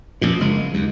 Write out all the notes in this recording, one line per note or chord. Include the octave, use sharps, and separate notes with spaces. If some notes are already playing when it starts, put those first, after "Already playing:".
A#1 F#2 A#2
F#1 G#3
D#2